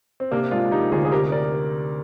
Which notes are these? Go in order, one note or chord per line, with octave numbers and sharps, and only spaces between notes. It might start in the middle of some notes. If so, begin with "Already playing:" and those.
C4
C3 A#3 D4
G#3 D4 F4
F4
F3 D#4 G4
D2 F4 G#4
G#4
C3 G4 A#4
A#4 D5